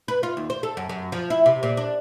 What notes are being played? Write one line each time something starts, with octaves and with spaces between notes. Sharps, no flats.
B4
F4
D#2
C5
A4
F#2
F#2
F3
E4
C3
A#2
D4